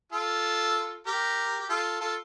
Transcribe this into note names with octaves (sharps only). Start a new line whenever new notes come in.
F4 A4
G4 A#4
G4
F4 A4
F4 A4